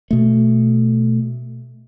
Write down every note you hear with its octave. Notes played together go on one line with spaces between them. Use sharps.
B2 A3